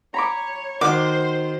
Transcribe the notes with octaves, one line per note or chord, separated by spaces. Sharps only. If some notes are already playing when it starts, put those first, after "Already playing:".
C#5 A#5 B5 D6
D#3 F#4 C5 D6